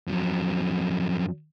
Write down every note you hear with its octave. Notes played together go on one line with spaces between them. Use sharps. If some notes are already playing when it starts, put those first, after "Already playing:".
F2 F#3